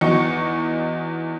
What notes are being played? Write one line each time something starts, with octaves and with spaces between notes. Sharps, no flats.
E2 D#4 F#4 C#6 C#7